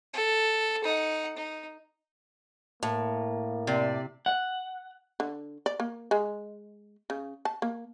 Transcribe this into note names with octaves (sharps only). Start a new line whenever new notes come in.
A4
D#4 F#5
D#4
A2 A#3
C3 D5
F#5
D3
D5
A#3
G#3
C#3
A5
A#3